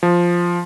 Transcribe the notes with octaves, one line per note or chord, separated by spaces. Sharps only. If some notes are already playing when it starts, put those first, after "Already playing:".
F3